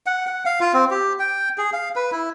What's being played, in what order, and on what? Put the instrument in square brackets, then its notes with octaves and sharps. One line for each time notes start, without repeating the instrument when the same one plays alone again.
[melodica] F#5
F#5
F5
F4
C4
G4
G5
G#4
F5
B4
E4